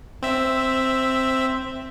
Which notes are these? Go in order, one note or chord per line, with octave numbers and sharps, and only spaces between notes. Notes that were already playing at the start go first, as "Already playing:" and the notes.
C4 E5